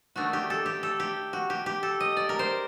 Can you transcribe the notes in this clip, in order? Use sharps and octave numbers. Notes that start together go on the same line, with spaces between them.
D#3 A3 D4 F#4
G4
A4
G4
A4
G4
F#4
G4
G4
A4
D#5
D5
A#4
C5